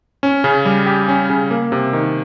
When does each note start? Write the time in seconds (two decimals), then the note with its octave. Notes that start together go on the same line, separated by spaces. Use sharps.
0.23 C#4
0.44 C#3
0.65 G3
0.86 G4
1.08 C#4
1.30 C#3
1.51 A#3
1.72 C3
1.93 D#3